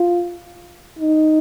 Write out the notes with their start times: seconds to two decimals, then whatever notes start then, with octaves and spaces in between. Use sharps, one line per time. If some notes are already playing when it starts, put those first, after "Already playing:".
Already playing: F4
0.99 D#4